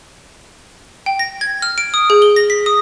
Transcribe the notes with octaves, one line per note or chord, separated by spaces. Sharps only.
G5
A#6
G#6
F6
D7
D#6
G#4
G7
A#6
B6
D#6